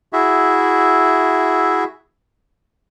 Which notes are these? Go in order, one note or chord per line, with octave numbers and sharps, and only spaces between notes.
E4 F#4 G#4 E5